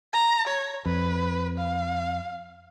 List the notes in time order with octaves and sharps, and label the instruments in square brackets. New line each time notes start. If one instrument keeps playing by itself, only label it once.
[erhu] A#5
C#5
[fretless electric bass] F2 [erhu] B4
[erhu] F5